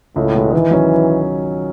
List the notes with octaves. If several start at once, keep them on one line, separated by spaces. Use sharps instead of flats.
C#2 A2
B2 G#3 B3
D#3 E3
F#3 C#4